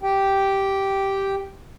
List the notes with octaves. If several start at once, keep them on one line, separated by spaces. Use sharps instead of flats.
G4 G5